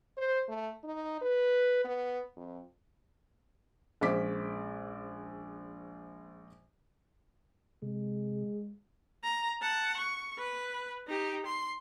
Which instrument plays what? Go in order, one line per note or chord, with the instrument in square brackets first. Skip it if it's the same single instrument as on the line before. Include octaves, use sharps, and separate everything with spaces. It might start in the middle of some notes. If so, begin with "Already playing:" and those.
[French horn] C5
A3
D#4
B4
B3
F2
[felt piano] A#1 G#3 C#4 C5 D6 B6
[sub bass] C3 [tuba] G#3
[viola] A#5
F#5 A5
C#6
B4
D#4 G4
C6